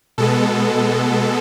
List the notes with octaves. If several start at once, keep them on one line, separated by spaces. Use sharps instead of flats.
B2 G#3 B3 A4